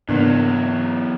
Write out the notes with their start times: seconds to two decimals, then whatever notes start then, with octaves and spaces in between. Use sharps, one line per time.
0.09 E2 G#2 C#3 F#3 G#3 A#3 B3 D4